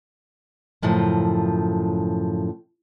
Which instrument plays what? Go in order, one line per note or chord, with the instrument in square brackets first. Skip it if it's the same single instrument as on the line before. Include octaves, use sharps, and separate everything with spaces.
[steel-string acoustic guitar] F#2 A2 C#3 F3